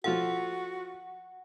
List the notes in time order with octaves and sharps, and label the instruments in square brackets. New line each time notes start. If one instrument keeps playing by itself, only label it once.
[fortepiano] F3 F4 A4 [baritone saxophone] F#4 [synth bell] F#5